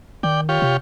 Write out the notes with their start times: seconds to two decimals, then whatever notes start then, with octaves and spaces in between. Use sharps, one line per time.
0.23 D#3 D5 G5
0.49 F4 G4 C#5
0.62 C3